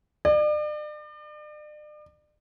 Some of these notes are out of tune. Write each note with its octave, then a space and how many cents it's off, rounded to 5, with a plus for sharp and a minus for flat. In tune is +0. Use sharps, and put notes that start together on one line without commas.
D5 +40